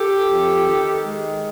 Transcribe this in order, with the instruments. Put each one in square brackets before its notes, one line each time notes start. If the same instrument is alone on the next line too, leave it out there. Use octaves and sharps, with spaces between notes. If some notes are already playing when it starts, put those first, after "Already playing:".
Already playing: [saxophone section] G4 A4
F2
D#3
G#3